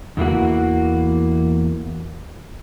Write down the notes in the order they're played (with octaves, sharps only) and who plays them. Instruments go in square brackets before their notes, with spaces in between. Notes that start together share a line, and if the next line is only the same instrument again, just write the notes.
[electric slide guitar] E2 E3 A#3 F#4